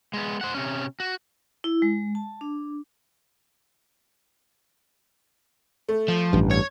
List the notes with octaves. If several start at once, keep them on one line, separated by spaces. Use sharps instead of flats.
G#3 B3
C5 F#5
C3 C#4
F#4
E4
G#3
A5
D4
A3
F3
A1 G2
C#5 G#6